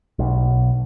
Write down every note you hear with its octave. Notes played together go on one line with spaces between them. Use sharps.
B1